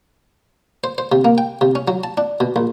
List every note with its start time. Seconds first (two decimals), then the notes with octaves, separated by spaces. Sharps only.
0.84 C5
0.98 C5
1.12 C3
1.25 A#3
1.38 G5
1.61 C3
1.75 C#4
1.88 F#3
2.04 A5
2.17 D4
2.40 B2
2.56 A#1